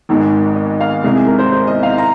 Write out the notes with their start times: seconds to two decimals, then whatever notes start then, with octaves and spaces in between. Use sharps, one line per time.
0.09 G#1 G#2 D#3 G#3
0.56 D#5
0.80 F5
1.03 C2 C3 G#3 G#4
1.15 G#4
1.27 A#4
1.39 C5
1.52 C5
1.67 D#5
1.83 F5
1.98 A#5